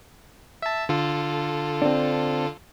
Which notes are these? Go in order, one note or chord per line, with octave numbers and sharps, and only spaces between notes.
E5 A5
D3 F4 A4
C4 D4